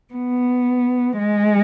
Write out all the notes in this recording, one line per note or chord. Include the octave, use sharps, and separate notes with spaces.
B3
G#3